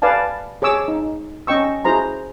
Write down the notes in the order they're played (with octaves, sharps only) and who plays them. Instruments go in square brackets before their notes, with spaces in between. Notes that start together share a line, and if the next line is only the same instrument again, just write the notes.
[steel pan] B4 D5 F5 G#5 A5
G#4 C#5 D6 E6
D#4
C#4 D#5 G5 C#6 E6
E4 F#4 G#4 C5 A#5 C6